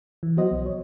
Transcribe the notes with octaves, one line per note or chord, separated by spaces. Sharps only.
E3
F3 F#3 B3 F#4 C5 D#5
B1
C#5